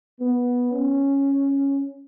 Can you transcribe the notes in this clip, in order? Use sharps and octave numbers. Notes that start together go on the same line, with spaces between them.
B3
C#4